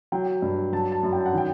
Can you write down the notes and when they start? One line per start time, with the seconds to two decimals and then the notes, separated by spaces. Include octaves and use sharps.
0.12 F#3 G5
0.42 G2
0.72 F#3 A5
0.92 A5
1.03 F#2
1.13 G5
1.26 F#5
1.33 D#3 G5